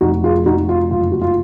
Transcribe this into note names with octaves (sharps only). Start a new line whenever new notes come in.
F1 D#4 F#4
F4 G#4
F1 D#4 F#4
F4
F#1 F4
F#4
F4